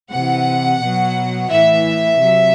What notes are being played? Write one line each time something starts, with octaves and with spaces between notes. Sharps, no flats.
C3 E3 F#5
B2 F#3
A2 E3 E5
C3 F#3